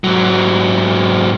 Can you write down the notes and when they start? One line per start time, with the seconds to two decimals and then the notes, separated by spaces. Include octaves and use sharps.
0.04 G#2 F#3